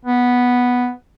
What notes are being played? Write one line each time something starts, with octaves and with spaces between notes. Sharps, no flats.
B3